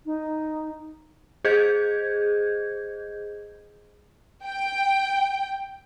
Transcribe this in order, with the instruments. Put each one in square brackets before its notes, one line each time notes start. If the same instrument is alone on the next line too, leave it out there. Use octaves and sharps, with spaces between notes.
[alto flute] D#4
[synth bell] G#4 C5 D#5 G6 G#6
[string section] G5